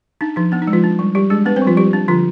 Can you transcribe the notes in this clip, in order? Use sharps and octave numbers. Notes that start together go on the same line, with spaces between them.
D4 D#4
F3 D#4
B3 D4
D#4
G#3
F3 F4
D4
G3
G3 G4
G#3 D4 G#4
B3 D4 B4
C4 C5
G3
F3 F4
G3 G4
D4
D3 F3 F4